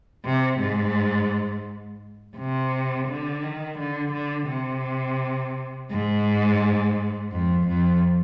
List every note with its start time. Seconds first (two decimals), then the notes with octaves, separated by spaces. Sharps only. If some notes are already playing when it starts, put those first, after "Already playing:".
0.25 C3
0.60 G#2
2.37 C3
3.08 D3
3.43 D#3
3.79 D3
4.13 D3
4.49 C3
5.90 G#2
7.32 F2
7.68 F2